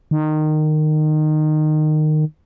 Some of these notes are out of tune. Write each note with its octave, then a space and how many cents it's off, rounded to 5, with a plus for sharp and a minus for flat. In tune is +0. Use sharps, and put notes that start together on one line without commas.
D#3 -20